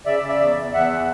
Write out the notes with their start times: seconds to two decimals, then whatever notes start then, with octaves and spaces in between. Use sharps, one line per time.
0.06 C#3 D5 E5
0.23 C#3
0.28 D5 E5
0.40 E2
0.56 E2
0.73 E2 E5 F#5
0.90 E3